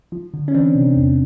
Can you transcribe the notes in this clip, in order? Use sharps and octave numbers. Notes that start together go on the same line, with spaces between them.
F3
D3
C#4
E3 C4 D4
C3
E2